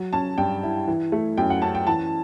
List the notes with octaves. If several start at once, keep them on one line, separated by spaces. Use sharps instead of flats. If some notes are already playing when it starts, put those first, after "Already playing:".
Already playing: F#3
C#4 A5
G2 G5
E4
E3
A3
F#2 G5
F#5
C#4 A5
G5
E3 A5